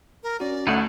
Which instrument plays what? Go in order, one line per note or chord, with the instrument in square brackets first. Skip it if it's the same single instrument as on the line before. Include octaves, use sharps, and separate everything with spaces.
[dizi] A#4
[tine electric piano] C#4 F#4 [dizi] D5
[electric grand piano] D2 A3 [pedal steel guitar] D#4 E4 F#5